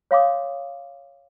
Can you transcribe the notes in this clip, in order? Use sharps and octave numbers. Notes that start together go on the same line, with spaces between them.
C#5 F5 C6 D6 D#6